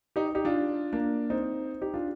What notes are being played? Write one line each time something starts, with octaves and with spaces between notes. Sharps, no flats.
D#4 G4
D#4 G4
D4 F4
A#3 D4
C4 D#4
D#4 G4
D4 F4